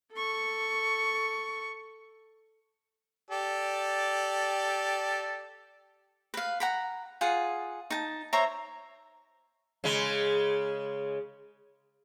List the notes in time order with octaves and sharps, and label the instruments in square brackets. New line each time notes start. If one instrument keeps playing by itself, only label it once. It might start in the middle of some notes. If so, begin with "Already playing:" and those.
[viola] A4 C#6
[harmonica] G4 A4 D5
[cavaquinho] B4 F5
F#5 A#5 B5
F4 G#4 F#5
D#4 A5
C5 C#5 E5 A#5
[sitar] C#3 G#3